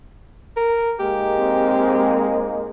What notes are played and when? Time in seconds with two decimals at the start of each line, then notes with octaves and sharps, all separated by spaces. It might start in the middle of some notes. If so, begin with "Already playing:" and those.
0.57 A#4
1.00 G#2 G#3 A#3 G4
1.39 C4